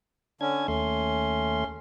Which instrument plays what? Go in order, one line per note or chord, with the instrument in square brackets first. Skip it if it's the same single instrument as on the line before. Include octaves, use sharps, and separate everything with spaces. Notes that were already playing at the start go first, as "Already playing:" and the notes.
[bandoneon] D3 C#4 [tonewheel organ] D4 G#6
[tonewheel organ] D#2 A3 C6 [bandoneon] C#4